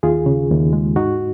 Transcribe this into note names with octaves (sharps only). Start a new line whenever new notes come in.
D#2 F4 G#4
C#3
D#2
G#3
G#2 D#4 F#4